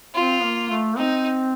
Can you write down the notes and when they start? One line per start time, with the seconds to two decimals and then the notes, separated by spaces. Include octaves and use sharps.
0.14 C4 F4
0.43 A#3
0.70 A3
0.97 C4 D#4